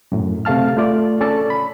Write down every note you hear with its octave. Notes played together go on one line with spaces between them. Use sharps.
F#2 A2
C3 A3 F5 A5 F6
A3 F4 D5
C#4 A4 D5 A5
B5